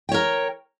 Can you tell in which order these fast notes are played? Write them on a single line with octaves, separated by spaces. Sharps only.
G5 C#5 A#4